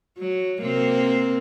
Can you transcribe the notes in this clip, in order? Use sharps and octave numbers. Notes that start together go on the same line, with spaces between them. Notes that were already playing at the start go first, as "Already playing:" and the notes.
F#3
C3 A#3 C4